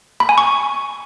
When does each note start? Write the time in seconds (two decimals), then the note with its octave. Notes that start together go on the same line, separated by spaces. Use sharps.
0.20 B5
0.29 G#5
0.38 C#6